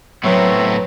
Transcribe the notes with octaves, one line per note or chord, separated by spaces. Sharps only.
A2 F#3 B3 C4 B4 C#5 E5 A#5